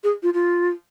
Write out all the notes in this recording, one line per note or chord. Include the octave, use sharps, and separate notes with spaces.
G#4
F4
F4